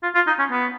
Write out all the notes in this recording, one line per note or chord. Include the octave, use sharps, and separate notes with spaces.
F4
F4
D#4
C#4
B3